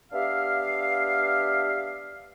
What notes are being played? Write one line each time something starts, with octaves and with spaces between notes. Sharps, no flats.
B3 D4 G4 E5 F5